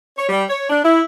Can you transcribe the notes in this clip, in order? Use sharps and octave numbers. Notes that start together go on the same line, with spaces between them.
C#5
G3
C#5
D4
E4